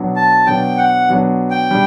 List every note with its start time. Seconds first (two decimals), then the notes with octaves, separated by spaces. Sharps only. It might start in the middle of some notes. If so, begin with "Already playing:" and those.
Already playing: B2 F#3 B3 D4
0.16 A5
0.47 B2 F#3 B3 D4 G5
0.78 F#5
1.08 B2 F#3 B3 D4
1.50 G5
1.71 G3 D4